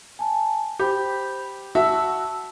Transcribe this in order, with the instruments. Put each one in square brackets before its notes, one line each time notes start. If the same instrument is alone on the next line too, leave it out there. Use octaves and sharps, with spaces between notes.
[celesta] G#5 A5
[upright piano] G4 [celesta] C5 B5 G6
[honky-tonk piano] F#4 [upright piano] E5 [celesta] A5 E6